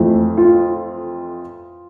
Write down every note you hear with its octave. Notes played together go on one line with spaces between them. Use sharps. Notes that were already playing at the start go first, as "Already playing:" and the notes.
Already playing: F2 E3 A3
F4